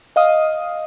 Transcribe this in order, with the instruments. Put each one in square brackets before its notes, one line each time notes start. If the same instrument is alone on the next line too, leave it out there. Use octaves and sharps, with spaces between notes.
[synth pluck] D#5 F5 D#6